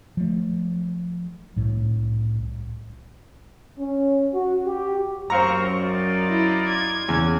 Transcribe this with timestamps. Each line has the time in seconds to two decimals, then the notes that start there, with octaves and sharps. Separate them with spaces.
0.17 F3 A3
1.56 C2 A2
3.78 C#4
4.33 F#4
4.65 G4
5.30 F#2 C4 A#4 C5 F5 A#5 C#6
5.80 D#4 F4 D5
6.29 E4
6.68 G#6
7.09 E2 C#3